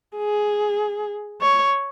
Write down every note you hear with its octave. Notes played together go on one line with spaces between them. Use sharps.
G#4
C#5